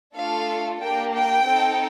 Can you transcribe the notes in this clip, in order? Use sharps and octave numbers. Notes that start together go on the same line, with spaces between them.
A3 D4 F4 A4 F5
A#3 D4 G4 G5
G5
C4 D#4 A4